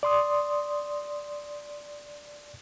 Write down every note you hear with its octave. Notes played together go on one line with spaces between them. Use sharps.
D5 C6 D#6